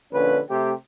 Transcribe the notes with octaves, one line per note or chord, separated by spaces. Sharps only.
A#1 D3 C#4 B4
C3 A3 G4